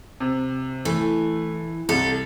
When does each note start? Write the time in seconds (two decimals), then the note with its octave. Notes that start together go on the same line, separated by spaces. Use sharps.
0.20 C3
0.85 E3 A3
1.89 C2 A4